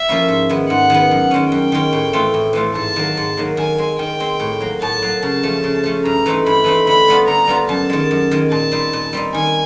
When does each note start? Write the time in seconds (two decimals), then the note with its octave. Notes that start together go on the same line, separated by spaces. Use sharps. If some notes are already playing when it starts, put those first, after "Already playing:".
Already playing: E5
0.09 F3 A#3 C#4 E4
0.28 G#2
0.49 D#3 G#3 B3
0.69 G#2 F#5
0.90 D#3 G#3 B3
1.11 F#2
1.31 D#3 G#3 C#4
1.52 F#2 G5
1.72 D#3 G#3 C#4
1.93 A2
2.13 E3 A3 C4 F4
2.34 A2
2.53 E3 A3 C4 F4
2.75 G#2 A5
2.96 D#3 F#3 A#3
3.17 G#2
3.37 D#3 F#3 A#3
3.57 D#3 G#5
3.78 G#3 C4
3.99 D#3 G5
4.20 G#3 C4
4.40 A2
4.60 F#3 A#3
4.81 A2 A5
5.02 F#3 A#3
5.22 C#3 A5
5.43 F3 A3 C#4
5.64 C#3
5.84 F3 A3 C#4
6.05 G2 A#5
6.26 E3 A3 C4 D#4
6.46 G2 B5
6.64 E3 A3 C4 D#4
6.87 D3 B5
7.08 G3 B3 D4 F4
7.28 D3 A#5
7.48 G3 B3 D4 F4
7.69 F#2 A5
7.90 D#3 G#3
8.11 F#2
8.31 D#3 G#3
8.52 A#2 A5
8.71 G3 C4 D#4
8.93 A#2
9.13 G3 C4 D#4
9.34 D#3 G#5